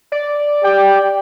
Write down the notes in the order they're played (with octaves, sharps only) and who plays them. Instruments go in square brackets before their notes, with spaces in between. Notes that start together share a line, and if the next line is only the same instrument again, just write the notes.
[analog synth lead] D5
[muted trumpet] G4 [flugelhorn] G5